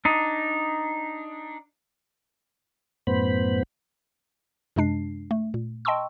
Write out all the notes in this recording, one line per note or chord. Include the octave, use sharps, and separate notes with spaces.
D4 D#4
F#2 A2 B3 C5 B5
F#2 C3 G#3 D4 C7
A3
A#2
D#5 G5 A5 C6 C#6 E6